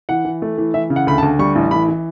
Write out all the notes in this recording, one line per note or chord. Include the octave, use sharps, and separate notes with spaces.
E3 F#5
E3
A3
E3
E3 E5
C#3
F#5
D2 B5
A5
D2
G3 C#6
A1
E3 B5
E3